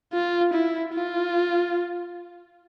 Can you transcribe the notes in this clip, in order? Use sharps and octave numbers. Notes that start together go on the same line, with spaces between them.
F4
E4
F4